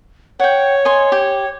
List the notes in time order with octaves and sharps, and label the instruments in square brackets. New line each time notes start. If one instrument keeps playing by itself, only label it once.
[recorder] C#5 [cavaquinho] F#5 G5
[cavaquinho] D#5 G#5 C6
G4